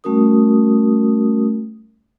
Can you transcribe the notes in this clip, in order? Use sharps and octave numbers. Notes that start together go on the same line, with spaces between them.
G3 A3 C#4 F#4 A#4 D#6